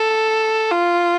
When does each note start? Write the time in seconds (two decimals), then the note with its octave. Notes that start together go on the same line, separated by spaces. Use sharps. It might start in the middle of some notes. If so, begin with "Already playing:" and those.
Already playing: A4
0.70 F4